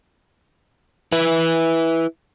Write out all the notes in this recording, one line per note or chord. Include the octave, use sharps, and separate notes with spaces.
E4 B4